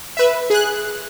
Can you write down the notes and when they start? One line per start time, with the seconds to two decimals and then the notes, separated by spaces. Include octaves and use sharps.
0.17 B4 E5
0.50 G#4 F#6